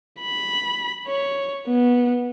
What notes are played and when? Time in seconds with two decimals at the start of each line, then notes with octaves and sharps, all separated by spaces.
0.21 B5
1.08 C#5
1.67 B3